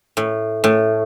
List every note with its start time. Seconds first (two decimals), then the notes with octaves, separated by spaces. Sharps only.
0.17 A2
0.64 A2